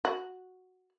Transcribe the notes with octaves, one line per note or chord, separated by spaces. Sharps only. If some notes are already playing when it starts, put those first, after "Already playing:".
F#4